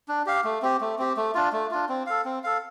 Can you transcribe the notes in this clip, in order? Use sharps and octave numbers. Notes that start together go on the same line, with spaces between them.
D4
G4 F5
A3
C4 G4
A3
C4 G4
A3
D4 F4
A3
D4 F4
C4
A4 F5
C4
A4 F5